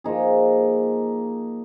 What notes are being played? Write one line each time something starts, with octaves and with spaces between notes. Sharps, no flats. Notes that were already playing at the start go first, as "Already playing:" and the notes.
F3 A#3 D#4 G#4